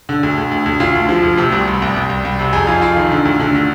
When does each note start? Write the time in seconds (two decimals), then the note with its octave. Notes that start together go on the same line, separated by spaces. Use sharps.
0.09 D3
0.23 D2
0.38 D2
0.51 D2
0.66 D2
0.80 D2 F4
0.95 D2
1.09 F3
1.23 D2
1.37 C3 G4
1.52 C2
1.67 C2
1.82 C2
1.96 C2
2.10 C2
2.25 C2
2.39 C3
2.53 F2 G#4
2.67 F2 F4
2.82 F2 F4
2.97 D#3
3.11 D3
3.25 D2
3.40 D3
3.55 D3